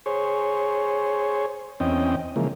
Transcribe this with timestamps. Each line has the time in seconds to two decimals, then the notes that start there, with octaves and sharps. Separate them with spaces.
0.06 G#4 C5 C#5
1.80 E2 C4 C#4 D#5 G5
2.36 C#3 E3 F3 G#3 A#3